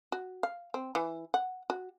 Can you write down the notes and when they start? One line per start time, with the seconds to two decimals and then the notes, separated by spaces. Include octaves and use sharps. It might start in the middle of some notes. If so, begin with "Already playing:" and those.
0.12 F#4
0.43 F5
0.74 C4
0.95 E3
1.34 F#5
1.70 F#4